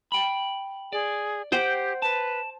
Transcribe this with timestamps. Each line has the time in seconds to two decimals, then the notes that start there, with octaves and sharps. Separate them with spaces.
0.12 G5 B5
0.93 G#4 D5
1.52 G4 C5 F#5 G5
2.02 B4 A5